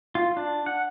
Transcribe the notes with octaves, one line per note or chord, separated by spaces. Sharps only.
F4
D4
F#5